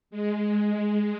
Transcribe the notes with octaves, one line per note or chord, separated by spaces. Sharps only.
G#3